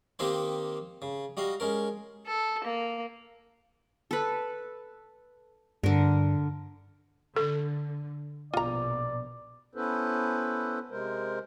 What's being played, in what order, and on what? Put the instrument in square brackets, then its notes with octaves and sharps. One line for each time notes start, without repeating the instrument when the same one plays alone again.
[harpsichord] D#3 A#3 C4 D#4 G4 C5
C#3
G3 F#4 D#5 F5
G#3 C#4 A#4
[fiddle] A4
A#3
[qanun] A4 B4
[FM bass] G2 [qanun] D3 A#4
[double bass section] D3 [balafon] A4
[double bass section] A#1 B2 [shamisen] F4 A#5 [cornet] D5
[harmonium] B3 C#4 E4 A4 B4 C5
C3 G#3 A#4 C5